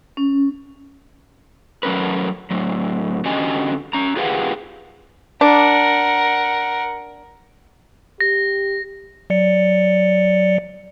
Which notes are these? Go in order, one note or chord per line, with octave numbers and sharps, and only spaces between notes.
C#4
F#3 A3 C#4 A#4 B4
A2 F#3
D3 C#4 F#4 G4 D#5 G#5
C#4 A#5
F4 G4 G#4 B4 F5 F#5
D4 A#4 F#5
G4 A#6
F#3 D5 C#7